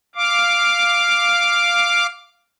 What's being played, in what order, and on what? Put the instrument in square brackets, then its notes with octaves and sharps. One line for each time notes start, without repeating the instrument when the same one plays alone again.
[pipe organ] F5 D6